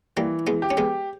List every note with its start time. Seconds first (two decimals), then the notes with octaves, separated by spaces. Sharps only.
0.16 E3 G3 A#3
0.47 G#3 B3
0.62 G4
0.70 C#4
0.77 G#3 B3